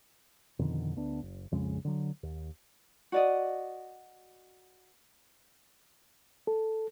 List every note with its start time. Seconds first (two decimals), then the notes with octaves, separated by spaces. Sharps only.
0.59 F2 B2 D3 D#3
0.96 D2 B3 D4
1.22 F#1
1.52 A#1 F2 C#3 G#3
1.85 D3 F#3
2.23 D#2
3.12 F#4 D5 D#5
6.47 A4